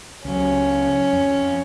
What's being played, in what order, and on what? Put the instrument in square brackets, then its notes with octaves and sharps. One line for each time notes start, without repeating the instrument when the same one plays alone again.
[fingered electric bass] C#2 F#3 [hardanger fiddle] C#4
[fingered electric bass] F2